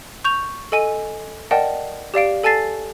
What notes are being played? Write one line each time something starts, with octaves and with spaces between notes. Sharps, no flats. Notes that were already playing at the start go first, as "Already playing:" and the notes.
C#6 G6 F7
A4 D#5 G#5 D#7
A#4 D5 D#5 F#5 G5 A5
G4 D5 F5 D7
A4 G#5 A5 A6 C7